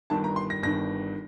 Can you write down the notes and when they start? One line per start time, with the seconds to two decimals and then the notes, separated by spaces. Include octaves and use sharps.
0.10 G1 G2 D#3 A5
0.24 A#5
0.36 C6
0.50 A#6
0.63 G1 G2 D#3 A#6